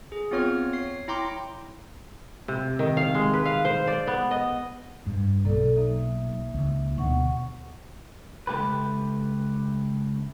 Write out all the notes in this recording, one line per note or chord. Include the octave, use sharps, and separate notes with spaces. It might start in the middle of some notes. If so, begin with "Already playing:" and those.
G#4
B3 C4 F4 C#5 C#6 F6
C#5 C7
E4 G5 A#5 C6 D6
C3
D#3
F5
G#3
B4
F5
C5
D5
B3
D#5
G2
B1 A#3 A4 D5
A#3 D#4 E5
C#2
D2 B2 F#5 C#6
C#2 A3 G4 B4